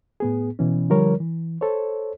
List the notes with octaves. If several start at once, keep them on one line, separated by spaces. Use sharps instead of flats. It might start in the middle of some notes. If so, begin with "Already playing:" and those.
A2 B3 G#4
B2 E3 C#4
D3 F3 G3 A#4 C#5
E3
A4 C5 C#5